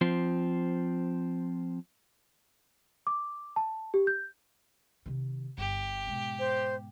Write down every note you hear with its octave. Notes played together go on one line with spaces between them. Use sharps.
F3 C4
D6
A5
G4
G6
C3 D#3
G1 G4
G#2 B2
C5